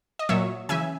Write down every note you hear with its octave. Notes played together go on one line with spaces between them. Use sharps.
D#5
A#2 F#3 C#5 E5
C#3 E3 E5 G#5